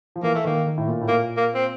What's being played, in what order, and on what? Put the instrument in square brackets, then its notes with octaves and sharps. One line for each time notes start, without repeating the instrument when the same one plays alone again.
[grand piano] F3
[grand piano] E3 [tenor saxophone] A#3
[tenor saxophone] A3
[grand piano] D#3 [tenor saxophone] A#3
[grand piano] D#3
A2
A#2
A2
[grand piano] A#2 [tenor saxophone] A#3
[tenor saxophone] A#3
C4